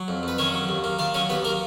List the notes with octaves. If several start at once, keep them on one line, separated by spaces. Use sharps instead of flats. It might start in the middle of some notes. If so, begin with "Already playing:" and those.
Already playing: F#3
F2
F2 B4
D#3 C#4 C#5
F#3
D#2
A#3
D#3 F4 F5
F#3 C#4 C#5
D#2 B3 B4
A#3 A#4